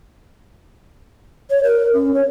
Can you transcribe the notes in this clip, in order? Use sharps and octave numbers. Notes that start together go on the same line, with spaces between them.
C#5
A#4
C#4
C#5